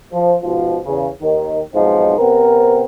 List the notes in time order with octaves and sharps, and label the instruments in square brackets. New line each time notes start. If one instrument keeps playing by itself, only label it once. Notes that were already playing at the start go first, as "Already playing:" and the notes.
[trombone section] F3
G#2 B2 F3
E2 C#3
D#2 D#3
B1 G#2 F3 C4 D#4
C3 B3 C4 A#4